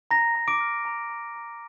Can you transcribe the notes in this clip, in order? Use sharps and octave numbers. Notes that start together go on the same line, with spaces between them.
A#5 A#6
A#5
D6 D7
F6
A#5
A#5
A#5